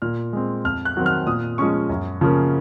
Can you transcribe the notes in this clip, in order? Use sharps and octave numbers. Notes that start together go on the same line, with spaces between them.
A#2 F6
G#3 C4
F2 F6
F#6
D#3 F#3 C4
F6
A#2 D#6
F3 G#3 C#4 C#6
F#2
C#3 F3 A#3 C#4